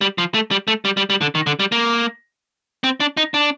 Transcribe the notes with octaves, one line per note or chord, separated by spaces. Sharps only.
G3
F3
A3
G3
A3
G3
G3
G3
D3
D#3
D3
G3
A#3
C4
D4
D#4
D4